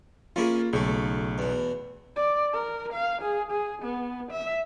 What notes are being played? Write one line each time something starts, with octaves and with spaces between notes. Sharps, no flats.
A#3 C#4 E4 F4 G#4
B1 C#3 A3
E2 B2
D5
A#4
F5
G#4
G#4
B3
E5